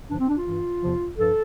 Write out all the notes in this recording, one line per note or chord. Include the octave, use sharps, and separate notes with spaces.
G2 D3 F3 D4
C4
D4
F4
G2 E3
E2 C3 F3
G2 F3 A4